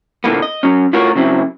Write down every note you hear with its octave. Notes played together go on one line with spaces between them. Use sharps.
A#2 D3 E3 A#3 B3
D#5
F#3 C#4
A2 F4 F#4 A#4 C#5
C#3 F#3 C4 E4